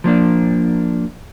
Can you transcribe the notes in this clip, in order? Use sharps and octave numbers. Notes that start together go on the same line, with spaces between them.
F3 A#3 D4